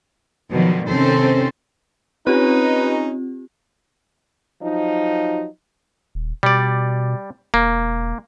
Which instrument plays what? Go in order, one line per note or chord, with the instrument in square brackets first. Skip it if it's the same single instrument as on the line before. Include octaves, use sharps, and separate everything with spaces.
[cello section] B2 D3 D#3 F3 F#3
C3 D#3 C4 C#4 A4 C5
[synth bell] C4 F4 G4 [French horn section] C#4 D#4 [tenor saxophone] B4
[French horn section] F3 F#3 D#4
[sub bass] D#1
[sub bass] B2 [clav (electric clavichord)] G3 D5
[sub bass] E1 [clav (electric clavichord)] A#3